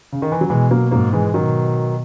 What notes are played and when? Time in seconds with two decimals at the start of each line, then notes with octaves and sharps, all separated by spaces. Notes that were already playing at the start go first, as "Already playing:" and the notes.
0.12 C#3
0.22 D#3
0.32 E3
0.41 F#3
0.50 B2 E3 G#3
0.71 F#3 A#3
0.91 G#2 F#3 A#3
1.13 E3 G#3
1.34 B2 D#3 F#3